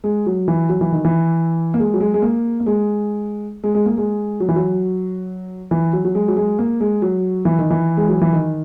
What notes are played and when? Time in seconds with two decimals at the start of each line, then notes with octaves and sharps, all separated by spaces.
0.04 G#3
0.26 F#3
0.48 E3
0.69 F#3
0.81 E3
0.92 D#3
1.05 E3
1.74 A#3
1.79 G#3
1.94 F#3
2.00 G#3
2.14 G#3
2.22 A#3
2.60 A#3
2.66 G#3
3.64 G#3
3.75 G#3
3.86 A#3
3.97 G#3
4.40 F#3
4.49 E3
4.56 F#3
5.71 E3
5.93 F#3
6.05 F#3
6.15 G#3
6.28 F#3
6.37 G#3
6.59 A#3
6.80 G#3
7.02 F#3
7.45 E3
7.59 D#3
7.70 E3
7.97 G#3
8.09 F#3
8.21 E3
8.33 D#3